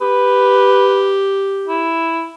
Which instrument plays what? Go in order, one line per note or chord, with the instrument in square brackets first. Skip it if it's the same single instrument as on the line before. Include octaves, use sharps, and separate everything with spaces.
[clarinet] G4 [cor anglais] B4
[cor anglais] E4